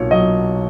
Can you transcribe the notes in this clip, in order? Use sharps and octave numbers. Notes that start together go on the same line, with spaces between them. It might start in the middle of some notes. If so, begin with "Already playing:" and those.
Already playing: B1 A#2 C#5
F#3 D#5